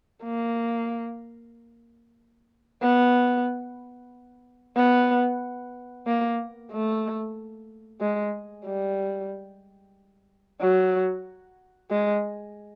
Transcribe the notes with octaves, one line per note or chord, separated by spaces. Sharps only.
A#3
B3
B3
A#3
A3
G#3
G3
F#3
G#3